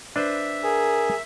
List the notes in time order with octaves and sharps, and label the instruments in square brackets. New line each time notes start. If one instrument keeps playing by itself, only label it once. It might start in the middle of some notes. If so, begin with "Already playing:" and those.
[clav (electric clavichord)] D4 B4 C5 [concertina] E5
[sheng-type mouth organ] G#4 [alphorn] A#4